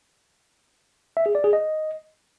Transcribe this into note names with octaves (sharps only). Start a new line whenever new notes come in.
E5
G#4
D5
G#4
D#5